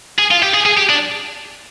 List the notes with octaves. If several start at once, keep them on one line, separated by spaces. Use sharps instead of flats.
G#4
F4
G4
G#4
G#4
G4
D4